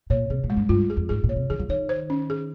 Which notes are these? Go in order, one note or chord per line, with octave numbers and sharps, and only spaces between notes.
A#2 C#5
C3 G#4
A#2
G#3
G2
G2 F4
G#4
F2
G#2 G#4
A#2
C#5
C3
D#3 G#4
F3
D#3 C#5
C5
C#4
G#4